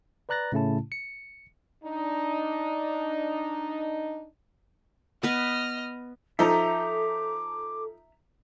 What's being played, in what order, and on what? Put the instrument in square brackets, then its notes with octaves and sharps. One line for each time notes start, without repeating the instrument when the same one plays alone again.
[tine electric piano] B4 D5 A#5 F#6 A6 A#6
A2 C#3 A3 C#4 E4 A5
C#7
[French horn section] D4 D#4
[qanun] B3 B4 [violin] D#5 F6
[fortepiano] F3 D#4 [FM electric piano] A4 [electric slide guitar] E5 A#5 [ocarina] D6